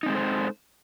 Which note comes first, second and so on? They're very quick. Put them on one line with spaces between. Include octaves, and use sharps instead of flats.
D#4 C4 G#3 A4 C5